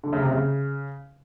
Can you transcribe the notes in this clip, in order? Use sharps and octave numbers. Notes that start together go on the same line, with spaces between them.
D3
C#3
C3
C#3